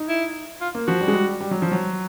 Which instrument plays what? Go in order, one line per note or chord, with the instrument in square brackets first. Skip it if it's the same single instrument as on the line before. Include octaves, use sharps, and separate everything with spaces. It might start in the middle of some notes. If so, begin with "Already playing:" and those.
Already playing: [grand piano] D#4
[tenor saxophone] E4
F4
[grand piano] A#3
[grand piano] F3 [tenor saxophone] F#4
[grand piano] G3
G#3
G3
G3
F#3
F3
F#3